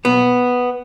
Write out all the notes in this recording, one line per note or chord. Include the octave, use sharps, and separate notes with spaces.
B1 B3